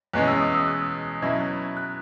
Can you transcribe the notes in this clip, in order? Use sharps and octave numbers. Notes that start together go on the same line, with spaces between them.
E2 B2 G#3 C#4 F#6
E6
D#6
E6
F#6
B2 F#3 C#4 E4 G#6
F#6